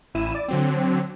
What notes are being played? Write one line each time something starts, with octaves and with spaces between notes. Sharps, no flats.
A1 E4 D#7 E7
D5
D3 F#3 C4